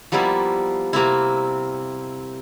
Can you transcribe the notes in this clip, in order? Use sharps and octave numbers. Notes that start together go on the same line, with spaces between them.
F3 G3 A#3 B3 E4
C3 A#3 C4 E4